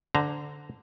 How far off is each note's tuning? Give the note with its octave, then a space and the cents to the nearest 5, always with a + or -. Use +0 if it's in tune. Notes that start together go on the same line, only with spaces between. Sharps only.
D3 +0 C5 -25 A#5 +0